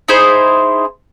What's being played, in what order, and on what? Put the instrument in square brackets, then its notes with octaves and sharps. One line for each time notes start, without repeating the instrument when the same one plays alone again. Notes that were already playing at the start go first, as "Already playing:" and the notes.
[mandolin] D#4 E4 G#4 C5